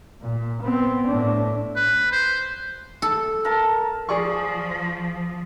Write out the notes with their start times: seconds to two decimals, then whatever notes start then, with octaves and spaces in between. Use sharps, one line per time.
0.21 A#2
0.62 B3 C4
1.08 A2 D4
1.76 B4
2.12 C5
3.02 A4
3.45 A#4 A5
4.09 F3 G#4 D5 C#6